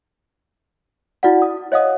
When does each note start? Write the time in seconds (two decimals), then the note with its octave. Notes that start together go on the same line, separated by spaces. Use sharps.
1.23 E4 F#4 D5 F#5
1.42 D#6
1.72 C#5 D#5 F5 F#5 D#6